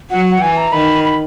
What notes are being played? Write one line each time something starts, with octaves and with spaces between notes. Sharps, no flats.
F#3 F#5
F#5
E3 G#5
A#5
D#3 B5
B5